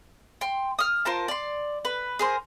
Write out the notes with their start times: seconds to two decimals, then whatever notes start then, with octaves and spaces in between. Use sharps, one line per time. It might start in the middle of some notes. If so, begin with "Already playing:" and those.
0.41 G5 C6
0.79 D#6 F6
1.05 F4 A#4 C5 A5
1.28 D5 C6
1.85 B4
2.19 G#4 A#4 C5